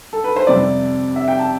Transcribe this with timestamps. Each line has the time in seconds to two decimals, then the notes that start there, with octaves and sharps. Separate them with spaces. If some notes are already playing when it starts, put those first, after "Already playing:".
0.13 A4
0.24 B4
0.36 C5
0.47 F2 C3 G3 D5
1.16 E5
1.28 G5
1.39 A5